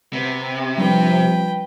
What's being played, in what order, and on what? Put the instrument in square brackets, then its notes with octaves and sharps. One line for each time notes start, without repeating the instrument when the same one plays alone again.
[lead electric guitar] C3 [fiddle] B3
[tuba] F3 [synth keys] G3 D4 [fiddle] B4 G5